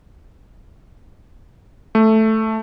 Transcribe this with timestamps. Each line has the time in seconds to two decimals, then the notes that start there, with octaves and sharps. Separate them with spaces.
1.95 A3